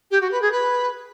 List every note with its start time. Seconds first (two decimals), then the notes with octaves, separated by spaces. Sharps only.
0.11 G4
0.21 F#4
0.31 B4
0.41 G#4
0.52 B4